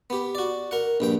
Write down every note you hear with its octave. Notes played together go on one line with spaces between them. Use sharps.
B3 G4
F#4 D5
A#4 F#5
A#1 G2 G5